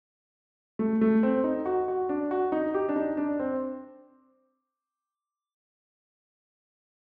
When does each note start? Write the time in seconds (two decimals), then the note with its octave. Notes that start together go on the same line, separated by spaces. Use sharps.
0.79 A3
1.01 A3
1.23 C4
1.44 D#4
1.66 F#4
1.88 F#4
2.09 D4
2.31 F#4
2.52 D#4
2.74 G4
2.89 D4
2.96 D#4
3.17 D4
3.39 C4